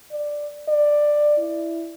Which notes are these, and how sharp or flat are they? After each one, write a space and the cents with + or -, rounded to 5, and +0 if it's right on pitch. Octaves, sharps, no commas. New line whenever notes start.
D5 +5
D5 +10
E4 +5